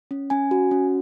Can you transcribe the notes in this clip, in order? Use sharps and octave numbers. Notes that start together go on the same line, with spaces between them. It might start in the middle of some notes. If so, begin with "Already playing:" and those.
C#4
C#4 G#5
F#4
C#4